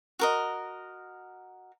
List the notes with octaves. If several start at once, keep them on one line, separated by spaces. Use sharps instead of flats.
F#4 A#4 D#5